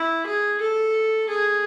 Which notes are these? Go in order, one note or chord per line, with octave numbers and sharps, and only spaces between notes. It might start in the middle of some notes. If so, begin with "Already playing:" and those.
Already playing: E4
G#4
A4
G#4